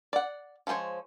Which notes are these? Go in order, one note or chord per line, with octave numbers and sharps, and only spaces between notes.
D5 F#5
F3 G#3 B3 C5 C#5